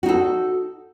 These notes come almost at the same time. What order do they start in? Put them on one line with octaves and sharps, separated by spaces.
F#4 D#4 A4